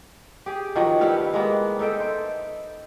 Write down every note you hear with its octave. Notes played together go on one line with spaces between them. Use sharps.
G4 G#4
D#3 F3 F#3 F#4
G3 B3 E4 F5
G#3 A#3 B3
D#4 A4 E5 G5
C5